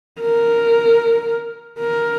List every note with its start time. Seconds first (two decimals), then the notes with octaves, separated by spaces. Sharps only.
0.21 A#4
1.79 A#4